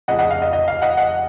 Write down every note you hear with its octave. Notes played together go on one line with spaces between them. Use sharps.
F1 F2 C#3 D#5 F#5
D#5 F#5
F5
D#5
D#5
F5
D#5 F#5
D#5 F#5